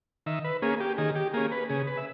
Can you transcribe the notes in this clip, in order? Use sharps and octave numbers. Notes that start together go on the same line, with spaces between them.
D#3 E5
B4
A#3 C#4 G#4
G4
D#3 G#4
G4
A#3 C#4 G#4
B4
C#3 G#4
B4
E5